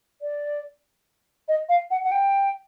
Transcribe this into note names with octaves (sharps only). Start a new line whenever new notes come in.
D5
D#5
F5
F#5
F#5
G5